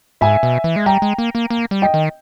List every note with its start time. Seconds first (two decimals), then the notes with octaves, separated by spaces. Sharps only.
0.21 G#2 E5 G#5
0.43 B2
0.64 E3
0.76 G#3
0.86 G3 G5 A#5
1.02 G#3
1.18 A#3
1.35 A#3
1.50 A#3
1.71 G3
1.82 D#5 G5
1.94 D#3